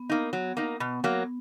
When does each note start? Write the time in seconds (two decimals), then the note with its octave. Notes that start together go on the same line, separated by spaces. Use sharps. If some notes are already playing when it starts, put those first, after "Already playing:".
Already playing: B3
0.10 A#3 D#4
0.33 F#3
0.57 A#3 D#4
0.80 B2 B3
1.04 F#3 A#3